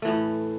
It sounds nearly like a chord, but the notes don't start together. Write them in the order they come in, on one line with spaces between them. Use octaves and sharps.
A3 E3 A2